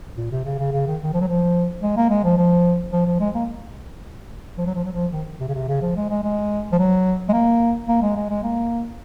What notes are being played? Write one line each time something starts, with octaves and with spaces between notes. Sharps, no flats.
A#2
C3
C#3
C#3
C#3
D#3
D#3
F3
F#3
F3
G#3
A#3
G#3
F3
F3
F3
F3
G#3
A#3
F3
F#3
F3
F#3
F3
D#3
C3
C#3
C3
C#3
F3
G#3
G#3
G#3
F3
F#3
G#3
A#3
A#3
G#3
G#3
G#3
A#3